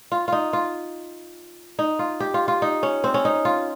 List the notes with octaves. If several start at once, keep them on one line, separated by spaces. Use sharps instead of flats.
F4
D#4 F4
F4
D#4
F4
G4
F4
F4
D#4
C#4
C4
C#4
D#4
F4